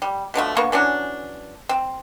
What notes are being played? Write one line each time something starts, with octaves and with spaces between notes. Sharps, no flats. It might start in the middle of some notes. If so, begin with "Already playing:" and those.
G3
B2 D3 F3 A3
D3 A#3 B3 C#6
E3 F#3 C#4 D4
C4